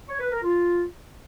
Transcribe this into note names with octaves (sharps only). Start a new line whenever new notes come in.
C#5
B4
A#4
F4